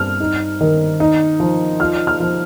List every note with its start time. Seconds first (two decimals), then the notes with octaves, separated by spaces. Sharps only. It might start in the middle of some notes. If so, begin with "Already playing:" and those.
Already playing: G2 C4 F6
0.20 D#4
0.61 D#3
1.00 D#4
1.40 F3
1.80 F4 F6
2.07 F6
2.20 F3